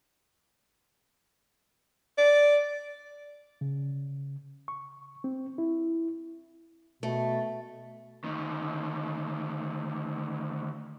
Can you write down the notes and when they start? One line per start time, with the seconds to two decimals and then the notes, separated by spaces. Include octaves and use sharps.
2.18 D5
3.61 C#3
4.68 C#6
5.24 C4
5.58 E4
7.03 B2 A3
8.24 D2 D#3